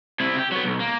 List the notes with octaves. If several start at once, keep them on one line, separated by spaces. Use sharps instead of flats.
C3 E4
G4
F#3 B3
B1
A#3